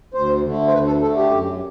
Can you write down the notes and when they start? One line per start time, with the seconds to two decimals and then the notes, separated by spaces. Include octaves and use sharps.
0.14 D2 C5
0.44 D3 A3
0.68 C5
0.73 D2 B4
0.87 A4
1.02 A3 A4
1.05 D3
1.17 G4
1.31 F#2